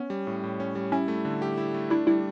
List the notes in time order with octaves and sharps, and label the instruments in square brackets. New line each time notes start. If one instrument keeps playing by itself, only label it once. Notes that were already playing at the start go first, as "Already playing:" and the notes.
Already playing: [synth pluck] B3 [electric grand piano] C#4
[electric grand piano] G3
A2
A2
C#4
G3
[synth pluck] C#4 [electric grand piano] E4
[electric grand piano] A3
D3
G4
E4
A3
[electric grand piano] D4 [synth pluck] E4
[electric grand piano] G3 [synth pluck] E4